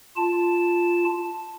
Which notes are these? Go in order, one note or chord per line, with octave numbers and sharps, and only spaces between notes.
F4 A5